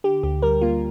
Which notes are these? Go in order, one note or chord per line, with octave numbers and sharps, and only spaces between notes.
D3 G4
D2 G4
G3 A#4
A#3 F4